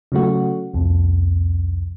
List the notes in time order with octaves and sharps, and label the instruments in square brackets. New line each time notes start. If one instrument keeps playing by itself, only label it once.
[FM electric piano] C#3 F#3 A3 F#4
C2 F2